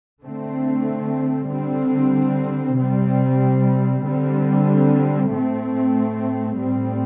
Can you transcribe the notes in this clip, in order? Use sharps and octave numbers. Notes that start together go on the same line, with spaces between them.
D3 A3 C4
D3 G3 C4
C3 G3 C4
D3 G3 C4
A2 A3 C4
A2 G3 C4